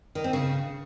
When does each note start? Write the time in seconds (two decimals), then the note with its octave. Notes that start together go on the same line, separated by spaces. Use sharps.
0.15 D#3
0.24 C4
0.33 C#3